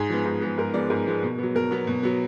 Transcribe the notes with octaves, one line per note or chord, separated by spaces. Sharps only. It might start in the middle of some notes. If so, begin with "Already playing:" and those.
Already playing: G#2 G#4
F3 G#3 B3
G#2
F3 G#3 B3
G#2 A#4
F3 G#3 B3 D5
G#2 A#4
F3 G#3 B3
B2
F#3 B3
B2 A#4
F#3 B3
B2
F#3 B3